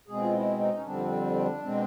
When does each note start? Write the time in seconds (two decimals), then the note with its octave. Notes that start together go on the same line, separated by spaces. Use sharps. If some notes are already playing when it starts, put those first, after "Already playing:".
0.08 B2 G#3 C4 G#4
0.22 F4
0.34 E4
0.59 D#4
0.73 C#4
0.85 F2 D3 G3 C4 D4
1.63 B2 G#3 C4